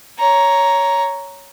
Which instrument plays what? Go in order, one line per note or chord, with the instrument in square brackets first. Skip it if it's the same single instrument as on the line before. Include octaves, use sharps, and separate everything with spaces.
[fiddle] C#5 A#5